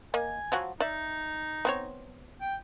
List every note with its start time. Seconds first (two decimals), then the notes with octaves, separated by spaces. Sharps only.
0.14 A#3 D#5 G#5
0.52 F3 F#3 F#4
0.80 D#4 D5 E5
1.65 B3 C4 C#5
2.41 G5